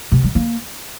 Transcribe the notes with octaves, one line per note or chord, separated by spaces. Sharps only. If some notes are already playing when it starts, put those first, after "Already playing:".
C3
G3
A#3